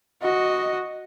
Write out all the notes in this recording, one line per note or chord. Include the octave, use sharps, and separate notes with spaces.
F#4 D#5